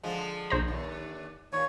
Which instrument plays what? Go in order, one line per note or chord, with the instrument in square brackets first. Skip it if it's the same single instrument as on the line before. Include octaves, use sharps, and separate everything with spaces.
[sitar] D3 F3 G#3
[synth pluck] B1 C5 A#5
[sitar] D#2 D3
[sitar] D#2 A#2 [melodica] C#5